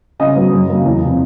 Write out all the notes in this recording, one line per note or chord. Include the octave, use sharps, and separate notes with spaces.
C#3 D#5 D#6
F#3 B3
F#2
C#3 F#3 A#3
E2
C3 F3